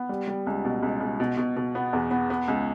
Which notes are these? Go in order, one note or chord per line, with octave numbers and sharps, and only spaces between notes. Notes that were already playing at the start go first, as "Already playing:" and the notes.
Already playing: B3
G3
G3
C#2
B2
C#2
C#2
B2
B2
B2
B3
E2
B3
B3
C#2